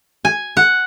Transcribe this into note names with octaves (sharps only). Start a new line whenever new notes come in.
G#5
F#5